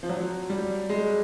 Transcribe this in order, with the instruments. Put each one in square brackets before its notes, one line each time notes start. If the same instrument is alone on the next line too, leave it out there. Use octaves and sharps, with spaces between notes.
[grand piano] F3
F#3
G3
G#3